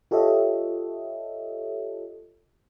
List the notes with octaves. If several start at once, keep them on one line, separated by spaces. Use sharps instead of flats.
F4 G4 A4 C#5 D#5 E5